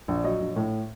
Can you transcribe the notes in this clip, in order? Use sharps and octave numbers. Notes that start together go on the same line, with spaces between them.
A#1
D5
F#3 C#5 D#5
A#1
A2